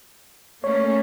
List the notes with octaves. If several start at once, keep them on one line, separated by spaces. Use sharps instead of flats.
A3 A#3 C#4 C#5